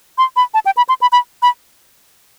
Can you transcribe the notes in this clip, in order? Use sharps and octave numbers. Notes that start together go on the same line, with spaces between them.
C6
B5
A5
G5
B5
C6
B5
B5
B5